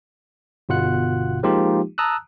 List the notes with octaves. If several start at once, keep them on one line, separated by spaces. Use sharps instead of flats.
G1 B2 F4 F#5 F#6
F3 G#3 A#3 D#4 F4 G4
A5 A#5 D#6 E6 F#6